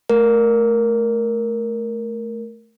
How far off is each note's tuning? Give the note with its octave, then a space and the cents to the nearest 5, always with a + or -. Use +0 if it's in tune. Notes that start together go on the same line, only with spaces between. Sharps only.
A3 -10 A#4 +0